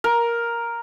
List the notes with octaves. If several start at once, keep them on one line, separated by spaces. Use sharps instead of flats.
A#4